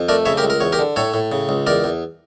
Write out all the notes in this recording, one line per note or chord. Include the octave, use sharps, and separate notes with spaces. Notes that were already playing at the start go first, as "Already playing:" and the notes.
Already playing: F2
A3 A#4 D5
C#3 C#5 E5
G4 A#4
C#2
A#4
E2 C#5
G4 A#4
D3
A2 A4 C#5
A2
C#3
C#2
E2 A#4 D5
E2